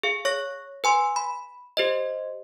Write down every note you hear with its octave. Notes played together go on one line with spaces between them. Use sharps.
G#4 F5
C#5 C#6 A#6
B4 G#5 C6
B5
G4 C5 D#5